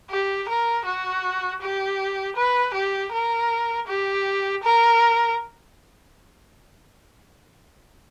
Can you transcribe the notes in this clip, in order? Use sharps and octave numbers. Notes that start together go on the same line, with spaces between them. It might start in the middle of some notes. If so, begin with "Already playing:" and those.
G4
A#4
F#4
G4
B4
G4
A#4
G4
A#4